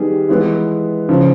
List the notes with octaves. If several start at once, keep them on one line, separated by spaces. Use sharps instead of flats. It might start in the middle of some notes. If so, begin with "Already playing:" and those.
Already playing: D#3 G3 B3 D#4 G#4
E3 G#3 B3
C#3 F3